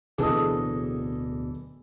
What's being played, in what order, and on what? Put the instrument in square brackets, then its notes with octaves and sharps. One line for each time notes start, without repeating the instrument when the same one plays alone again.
[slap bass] D1 B2 D4 [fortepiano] E3 A4 D#5 [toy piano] G#4 D#6